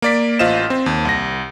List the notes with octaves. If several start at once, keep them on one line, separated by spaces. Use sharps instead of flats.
A#3 D5 B6
A1 F4 C5 D#5 E7
C4
D#2
C2 A#6